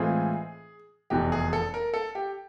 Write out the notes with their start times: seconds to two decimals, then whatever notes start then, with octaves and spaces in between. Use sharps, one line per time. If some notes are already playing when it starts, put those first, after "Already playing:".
Already playing: A2 E3 G#3 C4 F4 G#4
1.10 F1 E2 B2 G4
1.32 G#4
1.53 A4
1.74 A#4
1.94 A4
2.15 G4